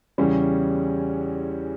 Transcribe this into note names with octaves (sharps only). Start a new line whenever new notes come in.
E2 C#3 G3 C#4